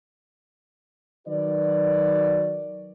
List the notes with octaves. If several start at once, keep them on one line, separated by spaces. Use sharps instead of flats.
D#3 F#3 F#4 B4 D5